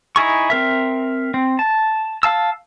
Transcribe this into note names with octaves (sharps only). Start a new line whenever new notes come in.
D#4 E4 G#4 C#6
C4 A#4 E5
C4
A5
F5 A5 E6